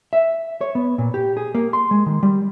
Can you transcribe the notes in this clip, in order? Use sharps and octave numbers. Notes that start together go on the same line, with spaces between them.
E5
C#5
B3
A#2
G4
G#4
A#3
C6
G#3
D#3
G3